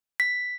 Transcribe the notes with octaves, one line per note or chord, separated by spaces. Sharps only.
B6